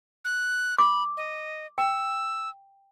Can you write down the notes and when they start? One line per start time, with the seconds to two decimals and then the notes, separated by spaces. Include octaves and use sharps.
0.25 F#6
0.78 B5 D6
1.17 D#5
1.78 G5 E6